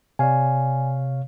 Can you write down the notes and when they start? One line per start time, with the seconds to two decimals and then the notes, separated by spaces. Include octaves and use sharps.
0.19 C3 C#5 D5 F5 G#5